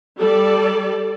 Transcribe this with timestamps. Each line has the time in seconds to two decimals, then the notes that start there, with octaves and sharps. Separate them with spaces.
0.18 G3 A4 D5